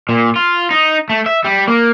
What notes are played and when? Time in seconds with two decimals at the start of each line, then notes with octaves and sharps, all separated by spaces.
0.09 A#2
0.36 F4
0.71 D#4
1.10 A3
1.26 E5
1.45 G3
1.68 A#3